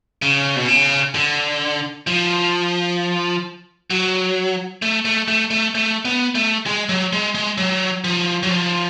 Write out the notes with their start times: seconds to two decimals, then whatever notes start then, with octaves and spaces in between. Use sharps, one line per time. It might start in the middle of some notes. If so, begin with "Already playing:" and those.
0.22 C#3
0.56 B2
0.68 C#3
1.15 D3
2.07 F3
3.90 F#3
4.82 A3
5.05 A3
5.28 A3
5.51 A3
5.75 A3
6.05 B3
6.35 A3
6.66 G#3
6.89 F#3
7.13 G#3
7.35 G#3
7.58 F#3
8.04 F3
8.43 F#3
8.50 F3